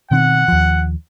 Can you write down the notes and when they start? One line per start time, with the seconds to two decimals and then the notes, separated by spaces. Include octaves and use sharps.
0.11 B2 D#3 C4 F#5
0.48 D#2 F3